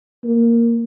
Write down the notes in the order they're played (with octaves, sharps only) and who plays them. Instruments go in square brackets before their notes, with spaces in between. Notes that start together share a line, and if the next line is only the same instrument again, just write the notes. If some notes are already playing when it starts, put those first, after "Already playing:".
[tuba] A#3